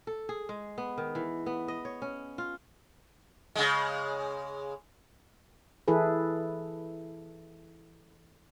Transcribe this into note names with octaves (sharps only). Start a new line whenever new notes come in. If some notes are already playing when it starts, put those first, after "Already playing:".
A4
G#4
G#3
B3
D#3
E3
B3
D#5
C#5
C#4
F4
C#3 G#3
E3 E4 G#4 A4 B4